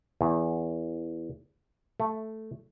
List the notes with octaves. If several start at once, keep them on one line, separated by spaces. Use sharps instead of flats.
E2
A3